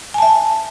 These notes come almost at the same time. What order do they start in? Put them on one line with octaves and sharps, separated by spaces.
G#5 A5 E5